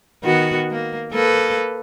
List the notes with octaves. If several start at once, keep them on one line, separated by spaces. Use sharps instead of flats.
D#3 B3 F#4
A#3
A#3 A4 B4